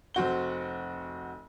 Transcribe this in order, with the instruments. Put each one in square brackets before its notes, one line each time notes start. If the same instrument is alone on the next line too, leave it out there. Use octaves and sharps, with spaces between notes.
[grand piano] F1 C4 F#4 G7